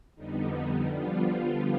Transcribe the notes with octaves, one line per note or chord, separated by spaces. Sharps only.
F2 D3 G3 B3 D#4
D3 F3 G3 B3 F4